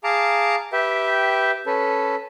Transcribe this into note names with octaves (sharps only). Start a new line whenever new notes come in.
G#4 F5 A5 A#5 D6
G4 B4 E5 G5
C#4 A4 B4